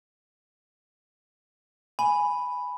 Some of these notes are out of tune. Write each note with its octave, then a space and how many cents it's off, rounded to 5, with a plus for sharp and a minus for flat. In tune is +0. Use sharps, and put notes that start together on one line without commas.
G#5 +0 B5 +0